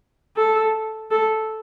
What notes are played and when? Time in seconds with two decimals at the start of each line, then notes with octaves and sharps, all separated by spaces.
0.36 A4
1.11 A4